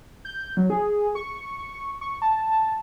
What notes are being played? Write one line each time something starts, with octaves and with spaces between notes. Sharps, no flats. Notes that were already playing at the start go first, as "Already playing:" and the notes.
G6
F#3
G#4
C#6
C#6
A5